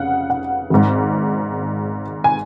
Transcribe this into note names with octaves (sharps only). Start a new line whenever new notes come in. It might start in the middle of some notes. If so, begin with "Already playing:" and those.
Already playing: F1 C#3 F5 F#5
F#5
G#1 G#2
G#5